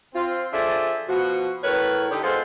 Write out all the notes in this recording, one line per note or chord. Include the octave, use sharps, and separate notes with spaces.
C4 F4
F3 D4 G#4 A4 E5
B2 F3 F#4
A2 A#4 B4 C#5
D3 D#4 G4
G#3 B3 F4 A4 C5